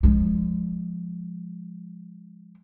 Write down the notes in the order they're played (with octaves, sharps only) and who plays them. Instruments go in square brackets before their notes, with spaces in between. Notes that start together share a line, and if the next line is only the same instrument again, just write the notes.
[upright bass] F3 G#3